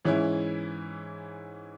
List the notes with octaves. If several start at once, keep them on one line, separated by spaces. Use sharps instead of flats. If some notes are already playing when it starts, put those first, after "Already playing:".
G#2 E3 C#4 E4